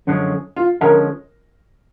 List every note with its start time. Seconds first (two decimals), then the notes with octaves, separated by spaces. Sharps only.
0.07 F#2 D3 F3 G#3 C#4
0.56 F4
0.81 D3 F3 G#3 C#4 A#4